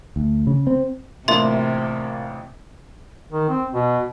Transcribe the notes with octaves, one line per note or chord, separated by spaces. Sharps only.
D2
C#3
C4
A1 C3 A#3 D4 E4 F4 E5 C6
D#3
C4
B2